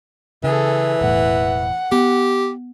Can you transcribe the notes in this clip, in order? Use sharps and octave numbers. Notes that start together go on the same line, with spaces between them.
C#3 E3 G#4 A4
E1 A2 F#5
B3 G4